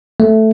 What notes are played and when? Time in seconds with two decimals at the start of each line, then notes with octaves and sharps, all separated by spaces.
0.20 A3